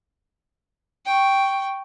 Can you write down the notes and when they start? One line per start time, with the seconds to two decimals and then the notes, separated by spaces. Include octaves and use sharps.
1.05 G5 C#6